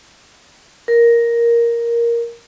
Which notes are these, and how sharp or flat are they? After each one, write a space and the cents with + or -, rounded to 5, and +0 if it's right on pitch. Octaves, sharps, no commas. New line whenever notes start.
A#4 +5